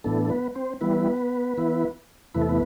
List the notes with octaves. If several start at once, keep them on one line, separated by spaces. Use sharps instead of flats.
A2 E3 B3 D4 A4
A4
B3 B4
C4 C5
E3 G3 B3 E4 B4
E3 B3 E4
E2 C3 E3 A3 E4 B4
A4
B3 B4